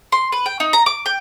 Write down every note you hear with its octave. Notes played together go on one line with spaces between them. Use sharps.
C6
B4
G5
D#4
A#5
D6
G5